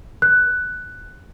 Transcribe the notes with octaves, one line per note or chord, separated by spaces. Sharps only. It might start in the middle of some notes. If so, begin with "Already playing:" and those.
F#6